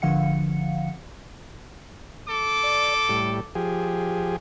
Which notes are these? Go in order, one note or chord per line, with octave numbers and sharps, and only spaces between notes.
G#1 D3 F3 F5 F#5 C#7
A4 D6
D5
A2 G3
F3 G4 G#4